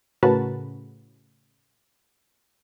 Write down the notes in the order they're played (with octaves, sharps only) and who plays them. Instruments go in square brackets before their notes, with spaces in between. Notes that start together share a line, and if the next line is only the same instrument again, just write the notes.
[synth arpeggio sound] A2 C#3 F#4 A#4 B4 A5